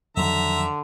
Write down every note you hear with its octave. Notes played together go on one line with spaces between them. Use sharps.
F2 D3 D#3 F#3 E5 A#5